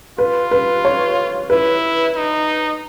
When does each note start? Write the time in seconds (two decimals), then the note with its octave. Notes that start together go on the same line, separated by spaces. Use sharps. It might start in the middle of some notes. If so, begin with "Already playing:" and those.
0.18 F4 B4
0.51 B4
0.85 C#5
1.50 E4 B4
2.16 D#4